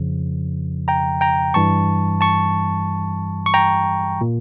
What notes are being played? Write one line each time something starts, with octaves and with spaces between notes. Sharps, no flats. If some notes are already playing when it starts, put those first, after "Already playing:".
Already playing: F2 C#3 F3
G5 A#5
G5 A#5
G2 E3 G3 A5 C#6
A5 C#6
C#6
G5 A#5
A#2